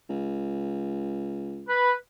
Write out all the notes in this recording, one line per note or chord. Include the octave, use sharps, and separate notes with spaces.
C#2
B4